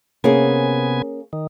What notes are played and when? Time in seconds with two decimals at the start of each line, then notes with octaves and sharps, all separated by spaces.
0.24 C3 A#3 B3 C#4 G#4 G#5
1.33 D#3